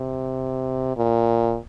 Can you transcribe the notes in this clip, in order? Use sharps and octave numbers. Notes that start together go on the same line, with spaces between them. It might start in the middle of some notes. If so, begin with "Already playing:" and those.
Already playing: C3
A#2